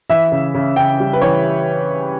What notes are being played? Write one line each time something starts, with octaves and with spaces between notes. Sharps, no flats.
E3 E5
C#3
C#3
C#3 G5
G3
B4
E3 C#5